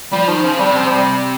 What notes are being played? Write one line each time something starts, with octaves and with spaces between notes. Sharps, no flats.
F3 G3
D#3 F3
C#3 F3
C3 G3
F3
F3
G3